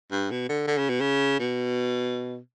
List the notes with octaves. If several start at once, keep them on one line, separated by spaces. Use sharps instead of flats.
G2
B2
D3
D3
C#3
B2
C#3
B2